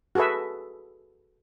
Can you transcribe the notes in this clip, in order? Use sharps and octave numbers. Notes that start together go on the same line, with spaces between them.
F#4 G#4 A4 B4 E5